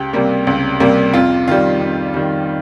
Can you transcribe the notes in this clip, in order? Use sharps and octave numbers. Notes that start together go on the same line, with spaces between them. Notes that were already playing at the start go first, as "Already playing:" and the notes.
Already playing: C#2 G4
C3 G3 A#3
C#2
C3 G3 A#3
F2 F4
D#3 G3 F4
F2
D#3 G3